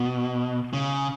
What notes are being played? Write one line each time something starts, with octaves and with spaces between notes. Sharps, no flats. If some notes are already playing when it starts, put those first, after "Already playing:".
Already playing: B2
C#3